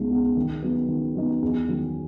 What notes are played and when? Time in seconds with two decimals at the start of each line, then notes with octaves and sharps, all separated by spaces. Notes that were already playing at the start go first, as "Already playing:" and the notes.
Already playing: C#2 B2 G#3 D#4
0.10 B2 G#3 D#4
0.37 D#3
0.62 F#3 B3 D#4
0.88 D#3
1.15 F#3 B3 D#4
1.42 E2
1.68 D#3 F#3